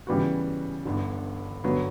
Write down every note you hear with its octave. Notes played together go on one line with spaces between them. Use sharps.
C#3 E3 G3 B3 F#4
G1 G2 D3
G1 G2 F#3 B3